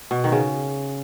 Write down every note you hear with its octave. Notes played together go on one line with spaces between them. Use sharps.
B2
D#3
C#3